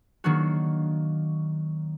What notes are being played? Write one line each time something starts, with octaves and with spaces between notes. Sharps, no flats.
D#3 F#3 A#3 D4 F#4